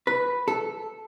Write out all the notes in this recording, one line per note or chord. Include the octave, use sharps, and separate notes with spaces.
B4
A4